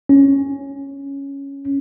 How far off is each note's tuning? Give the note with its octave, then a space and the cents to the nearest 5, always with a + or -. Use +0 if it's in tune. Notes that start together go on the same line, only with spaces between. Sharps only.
C#4 +0